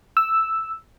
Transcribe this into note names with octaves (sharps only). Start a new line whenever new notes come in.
E6